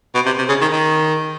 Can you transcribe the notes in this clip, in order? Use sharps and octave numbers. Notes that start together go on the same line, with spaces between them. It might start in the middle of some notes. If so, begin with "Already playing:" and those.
B2
C3
C3
C#3
D#3
D#3